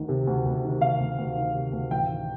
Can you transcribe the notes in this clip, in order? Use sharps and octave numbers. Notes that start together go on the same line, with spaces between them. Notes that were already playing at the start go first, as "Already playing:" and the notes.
Already playing: D2 D#3
C3
D2
D2
D#3
C3 F5
D2
D2
D#3
C3
D2
A1 G5
D#3